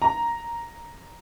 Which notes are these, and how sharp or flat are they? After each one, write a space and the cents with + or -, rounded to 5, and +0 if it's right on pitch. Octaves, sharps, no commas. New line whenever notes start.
A#5 +0